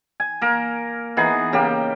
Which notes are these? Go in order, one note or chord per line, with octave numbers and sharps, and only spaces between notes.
G#5
A#3 A#4
E3 B3 D#4 G#4
C#3 A#3 G4